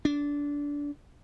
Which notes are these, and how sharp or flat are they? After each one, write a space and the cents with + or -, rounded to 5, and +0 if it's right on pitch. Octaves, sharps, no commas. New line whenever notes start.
D4 -20